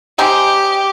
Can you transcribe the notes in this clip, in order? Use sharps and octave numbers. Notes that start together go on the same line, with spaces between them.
G#3 C4 D#4 G4